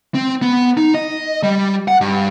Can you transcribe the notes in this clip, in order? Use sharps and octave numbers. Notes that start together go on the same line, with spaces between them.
C4
B3
D#4
D#5
G3
F#5
G2